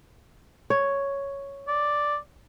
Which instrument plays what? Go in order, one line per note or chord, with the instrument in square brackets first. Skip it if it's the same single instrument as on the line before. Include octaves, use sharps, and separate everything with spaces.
[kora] C#5
[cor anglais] D5